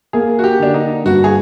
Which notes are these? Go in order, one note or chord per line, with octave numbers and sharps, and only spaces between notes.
A#3 G#4
F#4
G4
D3 D4
D#4
G2 F#4
G#4